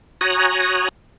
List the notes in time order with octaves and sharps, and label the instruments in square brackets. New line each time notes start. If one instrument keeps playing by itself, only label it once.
[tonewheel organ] F#4 C#5 G#5 A#5 D#6 F#6